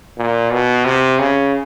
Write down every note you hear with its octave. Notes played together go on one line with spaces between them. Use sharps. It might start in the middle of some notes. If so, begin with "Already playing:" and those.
A#2
B2
C3
C#3